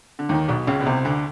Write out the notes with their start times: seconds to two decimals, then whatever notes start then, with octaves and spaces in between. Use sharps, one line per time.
0.19 D3
0.29 D#2 D#3
0.48 B1 B2
0.67 C#2 C#3
0.80 B2
0.86 C2 C3
1.05 D2 D3